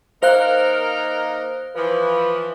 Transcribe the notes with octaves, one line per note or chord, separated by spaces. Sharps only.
A#3 D#4 A#4 C5 F5 F#6
E3 F3 B4